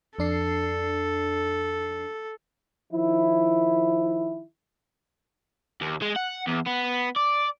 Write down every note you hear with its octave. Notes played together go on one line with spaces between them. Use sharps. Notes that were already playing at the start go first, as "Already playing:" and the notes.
F2 D4 A4 C7
D#3 F3 E4
D#2
G#3
F#5
E2
B3
D5